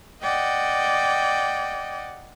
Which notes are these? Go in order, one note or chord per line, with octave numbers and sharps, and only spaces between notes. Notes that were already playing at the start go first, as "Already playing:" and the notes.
D5 D#5 F#5 G5